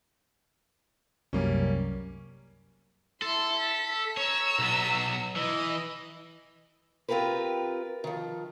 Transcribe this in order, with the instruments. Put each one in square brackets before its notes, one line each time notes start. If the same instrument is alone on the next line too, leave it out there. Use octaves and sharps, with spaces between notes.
[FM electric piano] C2 F#2 [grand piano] G3 A#3 C#4
[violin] E4 C6 [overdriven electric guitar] A4
[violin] B6
[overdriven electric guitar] C#5 [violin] A#5 E6
[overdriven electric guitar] B1 B3
[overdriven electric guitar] E3 [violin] D#5
[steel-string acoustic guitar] C4 F4 G4 A#4 B4
D#3 F3